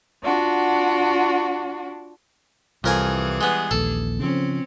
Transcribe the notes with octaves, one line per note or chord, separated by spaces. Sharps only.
D4 F4 F#4 F#5
C2 F2 E3 G3 G#4 A#4 G#5
G#3 B3
A#1 D#2 A4
C#3 F3 C4 C#4